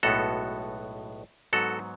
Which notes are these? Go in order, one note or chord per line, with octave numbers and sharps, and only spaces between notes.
B1 A2 G#3 B3 F#4 A4
G#2 F#3 B3 F#4 A4